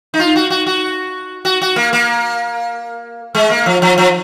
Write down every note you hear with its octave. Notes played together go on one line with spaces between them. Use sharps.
D#4
F4
F#4
F#4
F#4
F#4
F#4
A#3
A#3
G#3
A#3
F3
F3
F3